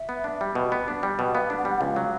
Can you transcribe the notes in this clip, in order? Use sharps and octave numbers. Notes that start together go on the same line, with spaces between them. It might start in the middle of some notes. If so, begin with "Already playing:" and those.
Already playing: E5
B3
D4
G3
B2
B3
D4
G3
B2
F#5
B3 F5
D4
F#5
G3
F#5
C#2 F5
F#3